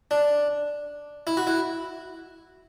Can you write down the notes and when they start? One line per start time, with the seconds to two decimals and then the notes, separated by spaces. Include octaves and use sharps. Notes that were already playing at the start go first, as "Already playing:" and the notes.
0.11 D4
1.27 E4
1.37 F#4
1.47 E4